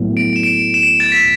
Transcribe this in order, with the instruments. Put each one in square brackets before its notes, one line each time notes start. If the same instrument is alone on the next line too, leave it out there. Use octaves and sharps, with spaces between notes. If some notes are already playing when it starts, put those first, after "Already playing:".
Already playing: [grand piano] A2 F#3 B3
[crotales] D7
E7
D7
E7
D7
A6
B6